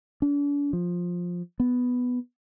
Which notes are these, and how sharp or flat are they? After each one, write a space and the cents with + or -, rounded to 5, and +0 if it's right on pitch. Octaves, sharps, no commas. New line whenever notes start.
D4 -40
F3 +10
B3 +5